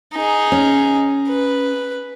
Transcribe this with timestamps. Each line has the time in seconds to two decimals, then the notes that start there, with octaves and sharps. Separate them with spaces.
0.13 D#4 G#4
0.52 C#4
1.29 B4